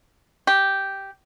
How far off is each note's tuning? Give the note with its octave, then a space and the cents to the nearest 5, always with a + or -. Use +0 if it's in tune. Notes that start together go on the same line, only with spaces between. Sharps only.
G4 -5